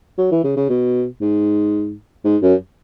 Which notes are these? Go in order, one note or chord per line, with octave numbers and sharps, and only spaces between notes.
F#3
E3
C#3
C#3
B2
G#2
G#2
F#2